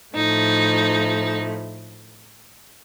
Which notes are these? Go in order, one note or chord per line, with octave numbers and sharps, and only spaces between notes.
A2 F3 A3 D#4